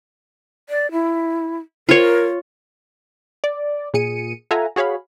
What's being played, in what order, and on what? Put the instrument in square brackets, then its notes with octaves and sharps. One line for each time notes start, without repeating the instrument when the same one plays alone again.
[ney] D5
E4
[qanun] F4 C#5 [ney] A#4
[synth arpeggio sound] D5
A#2 G#4 C#7 D#7
F4 A4 E5 F#5 G#5 A#5
F#4 G#4 C#5 F5 B5